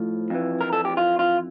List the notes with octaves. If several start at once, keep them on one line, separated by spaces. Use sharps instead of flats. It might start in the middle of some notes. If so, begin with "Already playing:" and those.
Already playing: A2 F3
F2 E3
A#4
A4
G4
F4
F4